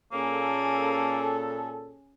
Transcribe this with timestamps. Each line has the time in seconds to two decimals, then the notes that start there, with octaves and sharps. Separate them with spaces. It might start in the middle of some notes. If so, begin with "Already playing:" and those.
0.12 A#2 A#3 C#4 G#4 A4